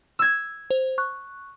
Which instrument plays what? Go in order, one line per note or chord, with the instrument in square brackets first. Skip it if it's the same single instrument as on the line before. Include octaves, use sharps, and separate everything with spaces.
[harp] E6 G#6
[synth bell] C5
C#6 F#6